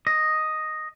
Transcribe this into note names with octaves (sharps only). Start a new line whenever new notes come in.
D#5